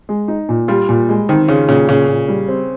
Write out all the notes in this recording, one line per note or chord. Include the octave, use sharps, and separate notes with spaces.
G#3
D#4
A#2
G3 F4
A#2
G#3
D#3 C4
C#3 F4
A#2 C#3
A#2 C#3
A#2
G3
C4